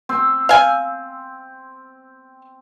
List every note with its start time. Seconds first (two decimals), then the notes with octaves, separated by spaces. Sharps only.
0.09 C4
0.49 F5 G#5